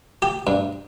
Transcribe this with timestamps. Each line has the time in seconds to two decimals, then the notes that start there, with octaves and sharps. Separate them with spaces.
0.22 G4
0.47 G2